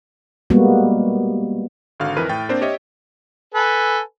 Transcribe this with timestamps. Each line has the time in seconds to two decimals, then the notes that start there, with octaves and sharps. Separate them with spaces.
0.50 G3 G#3 A#3 B3 F#4
2.00 G#1 D3 F#4 F5 F6
2.17 F2 E3 A#4 B4 D#7
2.29 A2 G5 A6
2.49 A#3 C4 D4 A#4 C5
2.61 G4 C#5 D#5 E5
3.54 A4 B4 G#5